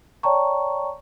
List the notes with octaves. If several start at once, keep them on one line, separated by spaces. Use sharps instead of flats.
C#5 D5 G5 A5 A#5 C#6